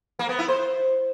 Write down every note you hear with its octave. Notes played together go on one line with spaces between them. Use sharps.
A#3
B3
E4
C5